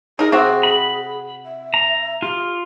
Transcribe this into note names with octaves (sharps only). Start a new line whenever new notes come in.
D#4 G#4 A#4
C3 C4 F#4
B5
E5
A#5
F4 G4